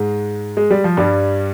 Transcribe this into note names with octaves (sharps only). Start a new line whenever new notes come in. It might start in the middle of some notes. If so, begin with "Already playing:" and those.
Already playing: G#2 G#3
G#3
G3
F3
G2 G3